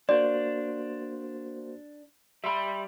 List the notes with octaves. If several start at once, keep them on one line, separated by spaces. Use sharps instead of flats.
A#3 D4 F#4 C5 D5
G3 E5 B5 C6